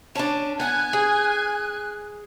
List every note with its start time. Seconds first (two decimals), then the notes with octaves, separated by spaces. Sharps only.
0.15 C#4 D4 A5
0.60 B3 F#5 G#5 F#6
0.93 G#4